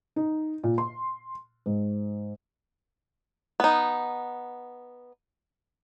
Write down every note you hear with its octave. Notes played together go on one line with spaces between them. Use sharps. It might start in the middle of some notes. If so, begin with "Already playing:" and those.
D#4
A#2
C6
G#2
B3 D#4